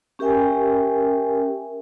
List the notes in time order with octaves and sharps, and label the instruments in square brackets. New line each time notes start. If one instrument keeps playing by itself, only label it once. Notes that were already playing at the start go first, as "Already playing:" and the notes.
[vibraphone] C#4 G4 A#4 E5 G5 G#5